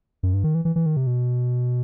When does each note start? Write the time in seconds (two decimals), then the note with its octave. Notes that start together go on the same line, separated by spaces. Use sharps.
0.23 F#2
0.34 G2
0.44 D#3
0.55 E3
0.65 E3
0.76 E3
0.86 D#3
0.97 C3
1.07 B2